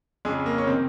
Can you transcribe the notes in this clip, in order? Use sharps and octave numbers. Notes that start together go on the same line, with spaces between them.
F2 C#3 G#3
A#3
C#4
C3 D#3 C4